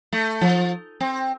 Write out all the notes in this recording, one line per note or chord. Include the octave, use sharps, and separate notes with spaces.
A3
F3
C4